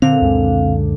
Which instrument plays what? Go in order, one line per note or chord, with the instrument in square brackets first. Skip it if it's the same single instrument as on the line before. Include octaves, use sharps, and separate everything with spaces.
[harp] A#2 D3 [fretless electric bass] C4 [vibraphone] F5
[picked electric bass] C#2 F#2 G#3